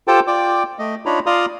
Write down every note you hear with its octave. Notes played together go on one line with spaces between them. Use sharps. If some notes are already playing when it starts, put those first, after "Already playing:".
F4 G4 A4 C5 G5 A5
F4 D5 G5 D6
A3 D#5
D4 D#4 F4 C#5 A#5 B5
F4 D5 F5 A#5 C6 D#6